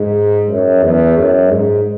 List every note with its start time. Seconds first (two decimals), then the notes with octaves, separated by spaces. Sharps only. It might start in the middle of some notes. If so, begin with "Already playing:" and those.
Already playing: G#2
0.49 F#2
0.82 E2
1.17 F#2
1.51 G#2